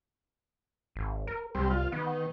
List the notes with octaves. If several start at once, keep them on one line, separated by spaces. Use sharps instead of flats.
G#1
A#4
C2 G3 C4
F4
D#3 B3